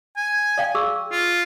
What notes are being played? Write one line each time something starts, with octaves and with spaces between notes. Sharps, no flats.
G#5
D5 F5 G5
G#4 C#6 E6
F4